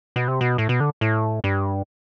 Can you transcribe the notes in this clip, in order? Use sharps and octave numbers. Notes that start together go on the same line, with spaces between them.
B2
C3
B2
A2
B2
D3
A2
G2